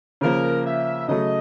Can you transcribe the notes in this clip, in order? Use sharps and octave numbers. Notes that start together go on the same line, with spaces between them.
C#3 F3 A#3 A#4
E5
C#3 F#3 A3 D#5